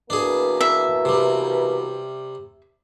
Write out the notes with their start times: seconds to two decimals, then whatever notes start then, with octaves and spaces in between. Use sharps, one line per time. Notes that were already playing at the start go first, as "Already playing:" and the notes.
0.10 B2 E3 A#3 D4 G#4
0.61 E5
1.05 C3 G3